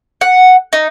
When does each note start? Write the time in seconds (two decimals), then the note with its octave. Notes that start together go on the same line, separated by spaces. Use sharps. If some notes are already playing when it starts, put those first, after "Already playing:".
0.21 F#5
0.73 D#4